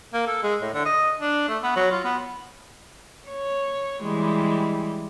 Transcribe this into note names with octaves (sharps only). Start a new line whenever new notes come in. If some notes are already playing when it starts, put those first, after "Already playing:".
A#3
A4
G#3
A2
D3
D#5
D4
A3
B3
F#3
F4
B3
C#5
E3 G3 G#3